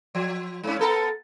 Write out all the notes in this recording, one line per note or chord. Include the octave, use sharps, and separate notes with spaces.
F3
G#2 C#4
B3 A4 A#4